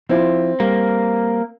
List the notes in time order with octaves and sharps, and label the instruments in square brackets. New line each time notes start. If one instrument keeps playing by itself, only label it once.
[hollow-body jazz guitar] F3 E4 F4 [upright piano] C4
[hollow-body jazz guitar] G3 [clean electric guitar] A#3